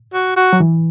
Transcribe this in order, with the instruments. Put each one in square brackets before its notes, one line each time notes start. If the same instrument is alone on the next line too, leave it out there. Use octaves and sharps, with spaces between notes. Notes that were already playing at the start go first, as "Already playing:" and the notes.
[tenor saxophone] F#4
F#4
[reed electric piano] F#3
E3